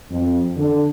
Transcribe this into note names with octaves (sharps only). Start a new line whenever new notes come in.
F2
D3